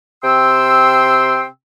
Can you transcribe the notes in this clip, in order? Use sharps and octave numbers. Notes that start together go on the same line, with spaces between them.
C3 G5 C6 E6